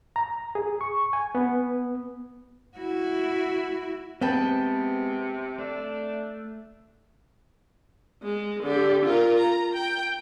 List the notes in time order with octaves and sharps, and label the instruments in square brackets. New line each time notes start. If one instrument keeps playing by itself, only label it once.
[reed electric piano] A#5
G#4
C#6
G#5
B3
[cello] E4 F#4
[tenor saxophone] C3 [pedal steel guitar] G#3 B3 [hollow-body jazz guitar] C4 [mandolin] B4 G5 A5
[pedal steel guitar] A3 [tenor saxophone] D4
[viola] G#3
D3 G4
F4 A#4
A#5
G5